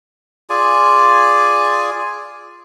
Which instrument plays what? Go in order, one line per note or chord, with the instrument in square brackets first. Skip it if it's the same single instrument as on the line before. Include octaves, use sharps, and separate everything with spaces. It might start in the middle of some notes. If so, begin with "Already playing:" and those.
[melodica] F4 G#4 D5 G#5